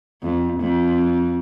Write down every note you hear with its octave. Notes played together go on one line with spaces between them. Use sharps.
F2
F2